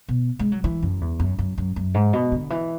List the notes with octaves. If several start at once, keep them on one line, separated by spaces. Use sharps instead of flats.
B2
G#3
F#3
E3
F#2
E2
F#2
F#2
F#2
F#2
G#2
B2
D3
E3